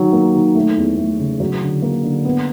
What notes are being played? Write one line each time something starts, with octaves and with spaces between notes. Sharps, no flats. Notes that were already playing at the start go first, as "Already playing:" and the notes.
Already playing: D#3 F#3
A#3
D#3
A3
E2
A3
C#3
F#3
D3
A#3
D3
B3